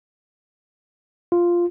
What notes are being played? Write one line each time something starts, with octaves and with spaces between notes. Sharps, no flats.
F4